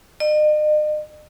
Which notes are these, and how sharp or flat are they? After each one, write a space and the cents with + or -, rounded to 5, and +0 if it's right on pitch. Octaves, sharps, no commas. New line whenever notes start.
D#5 -45